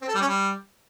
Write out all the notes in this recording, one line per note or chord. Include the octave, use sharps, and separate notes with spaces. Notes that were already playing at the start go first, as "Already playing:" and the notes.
C4
A4
G3
C#4
G3